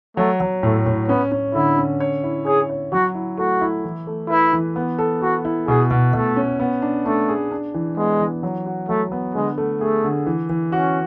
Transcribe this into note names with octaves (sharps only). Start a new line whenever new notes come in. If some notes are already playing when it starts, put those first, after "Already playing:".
F#3 A3
F#3
A2 A3
A2
B3 C#4
C#4
D3 E4
C#4
C#5
E4
G#4 C#5
C#5
F#3 F#4
E4
A3 F#4
E4
E3
A3
E4 B4
E3
B3
A4
B3 F#4
E4
B2 G#4
B2
B2 A3
C#4
B3
D4
A3 D4
G#4
D4
E3
G#3 B3
E3
F#3
F#4
F#3 A3
B3
D3 G#3
A3
A3 G#4
D3
E3
E3
C#4 F#4